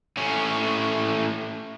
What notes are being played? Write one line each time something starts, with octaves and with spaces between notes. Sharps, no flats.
A2 C#4